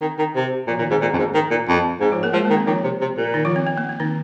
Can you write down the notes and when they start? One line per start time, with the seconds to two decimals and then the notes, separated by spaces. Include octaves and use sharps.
0.02 D#3 C4
0.19 D#3
0.35 C3
0.67 A#2 F3 F4
0.79 A#2 D#3 D#4
0.91 G#2 C4
1.01 A#2 A#3
1.13 F2
1.18 G#2
1.34 D#3
1.50 A#2
1.68 F2
2.01 G#2 C4
2.12 F3 F4
2.23 A#3 A#4
2.34 F3 G#3 G#4
2.45 D#3 A#3
2.57 C4
2.67 D#3 F3 F4
2.84 C3
3.01 C3
3.17 A#2
3.34 D#3 D#4
3.45 F3 F4
3.56 C4
3.67 C4
3.78 A#3
3.89 C4
4.00 D#3 D#4